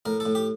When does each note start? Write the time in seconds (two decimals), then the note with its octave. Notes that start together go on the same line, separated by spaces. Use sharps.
0.06 A2 A#4
0.20 A4
0.25 A2
0.35 G4